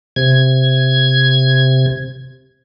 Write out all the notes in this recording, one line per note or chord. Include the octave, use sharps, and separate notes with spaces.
C3 G#6